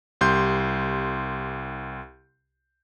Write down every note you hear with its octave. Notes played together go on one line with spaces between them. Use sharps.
C2 G4 C6 G6